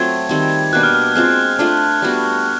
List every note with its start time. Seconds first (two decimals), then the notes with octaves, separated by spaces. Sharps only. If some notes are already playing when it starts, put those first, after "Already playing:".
Already playing: F#3 A3 C4 F4 G#6
0.29 D#3 G3 C4
0.73 B2 G3 A#3 D4 F#6
0.83 F6
0.94 F6
1.15 G#3 C4 F4 F6
1.59 A3 D4 F4
2.02 G3 B3 D4 F#4